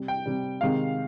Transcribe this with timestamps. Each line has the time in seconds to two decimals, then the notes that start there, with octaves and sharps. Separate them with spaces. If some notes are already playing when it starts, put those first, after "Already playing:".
Already playing: C3 G3
0.08 G5
0.26 C3 G3
0.61 C3 D#3 G#3 F5